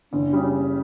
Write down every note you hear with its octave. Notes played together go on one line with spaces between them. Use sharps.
F#1 D4
C#3 G3